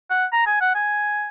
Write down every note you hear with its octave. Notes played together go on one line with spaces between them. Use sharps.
F#5
A#5
G#5
F#5
G#5